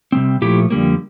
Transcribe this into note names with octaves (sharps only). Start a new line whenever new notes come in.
C3 G3 C4
A#2 F3 A3 E4 G4
F2 D3 G3 A#3